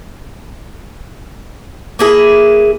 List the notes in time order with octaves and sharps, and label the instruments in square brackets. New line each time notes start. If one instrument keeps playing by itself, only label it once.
[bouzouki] A#3 E4 G#4